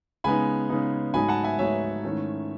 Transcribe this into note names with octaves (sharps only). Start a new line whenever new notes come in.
C#3 G#3 B3 D#4 G#5 B5
C#3 G#3 B3 D#4
G#2 F#3 A3 D#4 G#5 B5
F#5 A5
E5 G#5
G#2 F#3 A3 D#4 C#5 E5
G#2 D#3 A3 C#4 E4